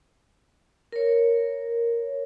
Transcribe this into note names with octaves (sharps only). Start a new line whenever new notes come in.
A#4 C#5